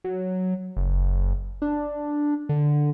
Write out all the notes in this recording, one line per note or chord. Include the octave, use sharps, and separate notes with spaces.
F#3
F#1
D4
D3